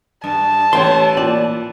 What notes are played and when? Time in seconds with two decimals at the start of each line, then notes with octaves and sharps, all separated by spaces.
0.24 G2 A5
0.73 A1 E3 C#5 G5 C6
1.17 A#2 D5 G5